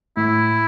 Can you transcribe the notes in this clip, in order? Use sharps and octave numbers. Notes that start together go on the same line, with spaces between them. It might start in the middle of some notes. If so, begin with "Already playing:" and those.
A2 E4